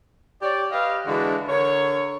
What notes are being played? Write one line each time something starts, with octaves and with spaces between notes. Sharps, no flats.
G4 C#5 D5
G4 B4 D#5 F5
D3 E3 G#3 D4 F#4
D3 A#4 C#5